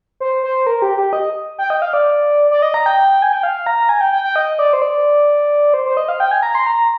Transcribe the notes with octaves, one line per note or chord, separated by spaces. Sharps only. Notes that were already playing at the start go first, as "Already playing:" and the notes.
C5
C5
A#4
G4
G4
D#5
G5
D#5
F5
D5
D5
D#5
A#5
G5
G#5
G5
F5
A#5
G#5
G5
G5
G5
D#5
D5
C5
D5
C5
C5
D#5
F5
G5
G#5
A#5
C6
A#5